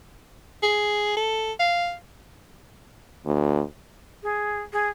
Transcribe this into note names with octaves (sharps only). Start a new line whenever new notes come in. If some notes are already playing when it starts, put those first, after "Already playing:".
G#4
A4
F5
D2
G#4
G#4